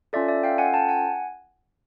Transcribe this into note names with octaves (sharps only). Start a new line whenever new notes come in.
C#4 F4 A4 D5 E5
D5 E5
F5 G5
F#5 G#5
G5 A5
F#5 G#5